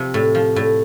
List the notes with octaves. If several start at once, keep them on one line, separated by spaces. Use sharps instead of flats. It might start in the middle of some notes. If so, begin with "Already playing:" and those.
Already playing: C3 F3
A2
F3
A2